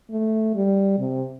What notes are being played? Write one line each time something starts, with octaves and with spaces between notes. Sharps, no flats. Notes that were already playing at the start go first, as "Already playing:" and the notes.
A3
G3
C3